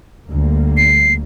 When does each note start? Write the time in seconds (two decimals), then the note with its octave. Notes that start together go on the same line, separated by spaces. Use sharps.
0.24 D2 G3 A#3
0.77 C7